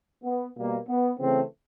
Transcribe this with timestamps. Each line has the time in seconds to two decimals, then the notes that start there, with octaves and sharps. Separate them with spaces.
0.24 B3
0.57 B2 G3 A#3
0.89 B3
1.20 C#3 E3 A3 C4